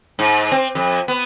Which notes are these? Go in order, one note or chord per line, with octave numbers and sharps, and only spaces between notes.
G#2
C4
F2
B3